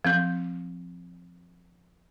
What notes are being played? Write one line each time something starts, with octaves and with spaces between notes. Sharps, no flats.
F3 C4 G6